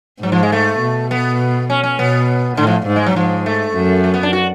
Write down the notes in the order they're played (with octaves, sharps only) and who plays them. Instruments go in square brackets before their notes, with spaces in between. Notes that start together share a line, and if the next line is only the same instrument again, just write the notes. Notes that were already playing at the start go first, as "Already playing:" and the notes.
[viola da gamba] G#2 [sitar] F#3
[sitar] F3
G#3
A3
[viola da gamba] B2
[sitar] B3
C#4
C#4
[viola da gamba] B2 [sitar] B3
[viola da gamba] A2 [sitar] D3
[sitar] F3
[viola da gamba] G#2
[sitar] G#3
F#3
[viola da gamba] G#2 [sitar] F3
[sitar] A3
[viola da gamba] F#2
[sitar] A3
B3
D4
F#4